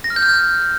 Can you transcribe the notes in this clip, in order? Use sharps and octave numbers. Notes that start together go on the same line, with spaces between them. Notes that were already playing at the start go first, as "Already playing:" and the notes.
A#6
F6
G6
F6